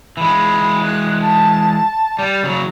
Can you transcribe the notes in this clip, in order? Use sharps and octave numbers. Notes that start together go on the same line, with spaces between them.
E3 G#3 B5
F#6
A5
G3 D5
C#3 F#3